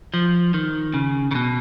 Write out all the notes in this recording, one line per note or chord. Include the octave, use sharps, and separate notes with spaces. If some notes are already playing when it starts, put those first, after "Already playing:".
F3
D#3
C#3
C#3
B2